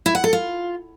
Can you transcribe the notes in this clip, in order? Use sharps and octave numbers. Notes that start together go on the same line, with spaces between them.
E4
F#5
A4
F4